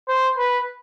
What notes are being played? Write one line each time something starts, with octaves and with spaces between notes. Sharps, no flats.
C5
B4